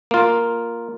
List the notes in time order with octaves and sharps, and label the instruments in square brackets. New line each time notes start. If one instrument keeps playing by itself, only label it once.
[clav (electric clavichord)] A#3 F4